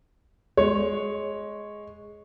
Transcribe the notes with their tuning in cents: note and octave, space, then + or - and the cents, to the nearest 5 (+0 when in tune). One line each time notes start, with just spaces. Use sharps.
G#3 +10 C#5 -5